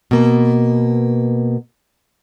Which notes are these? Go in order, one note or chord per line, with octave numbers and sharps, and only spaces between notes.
B2 A#3